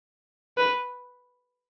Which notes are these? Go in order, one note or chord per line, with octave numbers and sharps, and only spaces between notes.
B4